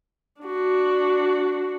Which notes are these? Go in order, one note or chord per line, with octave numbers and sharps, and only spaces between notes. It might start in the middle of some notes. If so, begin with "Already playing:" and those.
D4 F#4